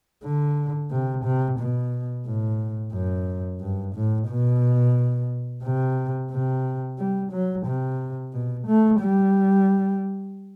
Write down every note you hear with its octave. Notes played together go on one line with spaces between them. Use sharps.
D3
C3
C3
B2
A2
F#2
G2
A2
B2
C3
C3
G3
F#3
C3
B2
A3
G3